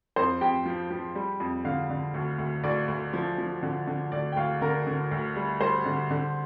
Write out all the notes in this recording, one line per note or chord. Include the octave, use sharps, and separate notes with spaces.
F2 C5 C6
F2 G4 G5
F3
F3
G3
F2
D3 F5
D3
D2
D2
D2 D5
D2
F3
F3
D3
D3
D2 D5
G5
D2 F5
D3 A#4 A#5
D3
D2
G3
G3 C5 C6
D3
D3